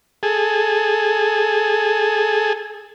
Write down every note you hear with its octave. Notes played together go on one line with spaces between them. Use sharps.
G#4 A4